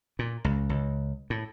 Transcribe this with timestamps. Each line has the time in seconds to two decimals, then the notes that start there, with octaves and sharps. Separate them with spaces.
0.19 A#2
0.45 C#2
0.69 C#2
1.30 A2